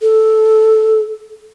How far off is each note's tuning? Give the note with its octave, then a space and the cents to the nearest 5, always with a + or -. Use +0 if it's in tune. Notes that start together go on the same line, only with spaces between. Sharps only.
A4 -5